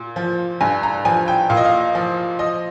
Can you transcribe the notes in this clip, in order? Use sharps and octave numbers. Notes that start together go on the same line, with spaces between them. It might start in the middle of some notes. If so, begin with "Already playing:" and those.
Already playing: A#2
F3
G2 G#5
A#5
F3 G#5
G5
A#2 F5
D#5
F5
F3
F3 D#5